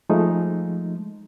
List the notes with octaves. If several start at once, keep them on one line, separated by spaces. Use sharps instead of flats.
F3 G#3 A3 D#4